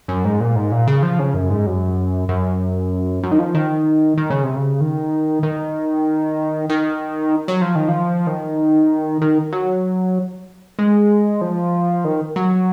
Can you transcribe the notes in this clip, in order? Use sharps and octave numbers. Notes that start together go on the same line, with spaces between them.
F#2
G#2
A#2
G#2
A#2
C#3
F3
C#3
F#2
G#2
F#2
F#2
F#2
D#3
F3
D#3
D#3
C#3
C3
C#3
D#3
D#3
D#3
F#3
F3
D#3
F3
D#3
D#3
F#3
G#3
F3
D#3
F#3